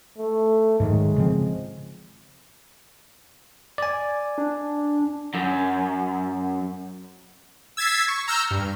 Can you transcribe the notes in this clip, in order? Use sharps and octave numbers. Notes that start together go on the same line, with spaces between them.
A3
G#2 D#3 F#3 G#3
C#3 F3 C4
D5 G#5
D4
F#2
E6 G#6 A6 B6 C7
C#6
A#5 E6 F6 G6
G2